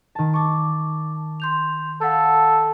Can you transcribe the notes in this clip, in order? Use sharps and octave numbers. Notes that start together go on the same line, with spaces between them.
D#3 A5
A5 C#6 D6 A6
C6 G6 F7
A4 F5 F#5 A5